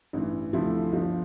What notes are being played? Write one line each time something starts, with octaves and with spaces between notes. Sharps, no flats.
A1 G2 E3
D2 C3 F3 A3 E4
G1 G2 F3